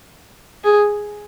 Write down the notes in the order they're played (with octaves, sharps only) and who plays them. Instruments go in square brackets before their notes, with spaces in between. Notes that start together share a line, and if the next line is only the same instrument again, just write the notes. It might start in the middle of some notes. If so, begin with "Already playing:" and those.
[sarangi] G#4